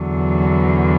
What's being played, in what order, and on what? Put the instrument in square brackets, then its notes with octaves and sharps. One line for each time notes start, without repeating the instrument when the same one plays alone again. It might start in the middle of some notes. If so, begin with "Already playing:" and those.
Already playing: [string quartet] E2 D3 F#3